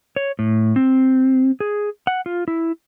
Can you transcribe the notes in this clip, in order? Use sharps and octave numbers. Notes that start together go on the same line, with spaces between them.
C#5
A2
C4
G#4
F#5
F4
E4